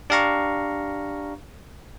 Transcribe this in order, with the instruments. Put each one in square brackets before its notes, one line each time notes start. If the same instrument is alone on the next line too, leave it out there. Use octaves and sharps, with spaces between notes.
[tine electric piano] D4 G4 F5 A#5 C#6